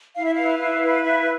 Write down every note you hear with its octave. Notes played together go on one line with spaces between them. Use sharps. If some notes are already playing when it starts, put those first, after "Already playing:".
E4 F5
E5
B4 F5
E4
B4
E4 E5